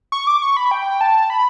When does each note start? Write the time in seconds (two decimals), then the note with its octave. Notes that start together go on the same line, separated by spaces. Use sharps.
0.12 C#6
0.27 D6
0.42 C#6
0.57 B5
0.71 G5
1.01 A5
1.30 B5